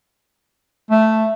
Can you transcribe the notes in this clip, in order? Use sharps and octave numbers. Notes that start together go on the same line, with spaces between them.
A3